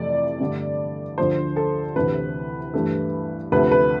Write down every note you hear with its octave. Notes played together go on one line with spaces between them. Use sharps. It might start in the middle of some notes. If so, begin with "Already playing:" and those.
Already playing: F2 C3 E3 A3 D5
G2 D3 A3
D2 D3 F3 C5
A4
D2 C3 E3 B4
G2 E3 A3
D2 C3 F3 A3 B4
B4